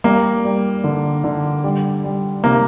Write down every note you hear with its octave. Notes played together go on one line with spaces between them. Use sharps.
G3 A#3
G3
D3
D3
G3
G3
C3 A#3